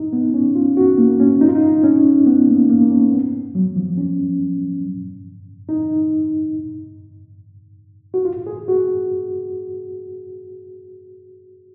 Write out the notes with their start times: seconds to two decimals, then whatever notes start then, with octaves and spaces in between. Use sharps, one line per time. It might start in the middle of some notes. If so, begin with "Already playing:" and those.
Already playing: D#4
0.13 B3
0.34 C#4
0.55 F4
0.77 F#4
0.98 A#3
1.20 C#4
1.41 D#4
1.48 F4
1.55 D#4
1.83 C#4
2.26 B3
2.48 A#3
2.70 A#3
2.91 C#4
3.12 B3
3.55 F#3
3.76 F3
3.98 C#4
5.69 D#4
8.14 F#4
8.25 F4
8.47 G#4
8.68 F#4